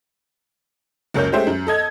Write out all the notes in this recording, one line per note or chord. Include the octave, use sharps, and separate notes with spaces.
F#1 C#2 A#4 C#5 G6
G#3 A3 C#4 G4 C5 E5
F#2
A4 D#5 G#6